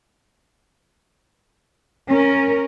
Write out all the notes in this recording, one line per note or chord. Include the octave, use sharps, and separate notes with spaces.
C#4 A#4